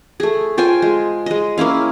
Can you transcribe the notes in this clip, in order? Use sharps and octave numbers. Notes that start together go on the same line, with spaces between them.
A3 G#4
F4 C5 G5 G#5
G#3
G#3 D#5
A#3 C#4 E4 F5